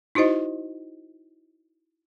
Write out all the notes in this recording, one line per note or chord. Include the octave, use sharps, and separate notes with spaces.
D#4 E4 F#4 C5 D#5